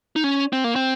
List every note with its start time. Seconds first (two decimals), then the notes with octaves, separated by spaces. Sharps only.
0.16 D#4
0.24 C#4
0.53 C4
0.64 A#3
0.76 C4